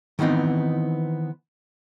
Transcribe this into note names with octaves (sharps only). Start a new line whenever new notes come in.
D#3 E3 B3 C4 D#4